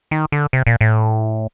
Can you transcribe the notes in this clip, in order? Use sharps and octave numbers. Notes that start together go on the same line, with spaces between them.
D#3
D3
C3
A#2
A2